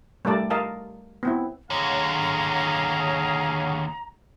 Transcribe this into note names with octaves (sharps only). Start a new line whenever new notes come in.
G3 A3 A#4 D5 A5
A#4 D#5 F5 A5
B3 C4 E4
D#2 D3 G#4 C#5 D#5 F5 F#5 A#5